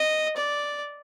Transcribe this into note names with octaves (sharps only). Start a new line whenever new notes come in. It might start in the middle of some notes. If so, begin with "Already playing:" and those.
Already playing: D#5
D5